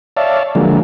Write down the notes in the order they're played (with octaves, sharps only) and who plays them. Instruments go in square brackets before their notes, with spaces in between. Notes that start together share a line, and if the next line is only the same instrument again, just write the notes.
[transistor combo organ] C#5 D5 E5 F5 A5
D3 F3 F#3 G#3 A#3